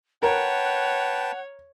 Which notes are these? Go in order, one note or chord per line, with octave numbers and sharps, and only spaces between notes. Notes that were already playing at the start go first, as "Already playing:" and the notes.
A#4 B4 C#5 F#5 G5 A5